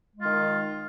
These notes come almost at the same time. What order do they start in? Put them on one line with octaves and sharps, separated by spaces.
G#3 F4 D#3